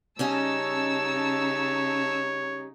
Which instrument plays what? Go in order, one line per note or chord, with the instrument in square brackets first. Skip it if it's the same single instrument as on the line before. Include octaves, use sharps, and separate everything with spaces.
[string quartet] C#3 D#4 [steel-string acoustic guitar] G3 C#4 D#5 [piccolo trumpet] C#5 [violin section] A5 E6